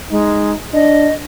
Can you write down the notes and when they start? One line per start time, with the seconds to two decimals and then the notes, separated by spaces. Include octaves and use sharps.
0.11 G#3 D#4
0.74 D4 D#5